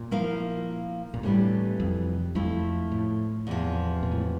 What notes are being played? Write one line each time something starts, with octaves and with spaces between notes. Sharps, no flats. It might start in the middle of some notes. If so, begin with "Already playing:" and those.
Already playing: A#2
F3 A#3 E4 A#4 F5
A#2
A2 C3 E3 G3 D4 A4
F2
F2 F3 A3 E4
A2
E2 C3 F3
A#2
A2